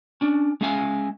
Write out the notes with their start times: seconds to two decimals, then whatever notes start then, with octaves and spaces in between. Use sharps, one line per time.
0.21 C#4 D4
0.61 G#3 C#4 E5 F5 G#5